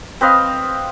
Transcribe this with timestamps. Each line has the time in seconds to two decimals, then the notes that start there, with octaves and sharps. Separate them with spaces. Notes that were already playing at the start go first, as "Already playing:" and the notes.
0.21 C4 B4 D#5 F5